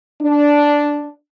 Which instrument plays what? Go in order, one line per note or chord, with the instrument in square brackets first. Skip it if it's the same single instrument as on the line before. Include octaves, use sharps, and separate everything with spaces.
[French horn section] D4